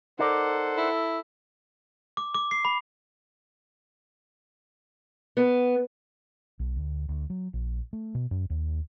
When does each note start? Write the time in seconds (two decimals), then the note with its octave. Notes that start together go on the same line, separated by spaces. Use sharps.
0.19 D#4 A4 A#4 C5 D5 F#5
0.77 E4
2.17 D6
2.34 D6
2.51 C7
2.65 B5
5.37 B3
6.59 B1
6.76 D2
7.09 D2
7.30 F#3
7.54 A#1
7.93 A3
8.15 B2
8.31 F#2
8.50 D#2